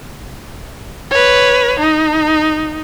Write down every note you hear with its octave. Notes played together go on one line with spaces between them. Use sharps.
B4 C#5
D#4